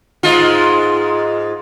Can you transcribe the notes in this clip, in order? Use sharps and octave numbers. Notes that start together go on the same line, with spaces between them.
G#2 G#3 F4